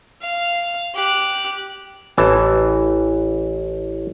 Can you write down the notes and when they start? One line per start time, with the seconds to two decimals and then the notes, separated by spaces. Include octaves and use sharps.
0.22 F5
0.94 G4 F#6
2.17 A1 E3 A5